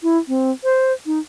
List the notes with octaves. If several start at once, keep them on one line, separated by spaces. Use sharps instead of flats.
E4
C4
C5
D#4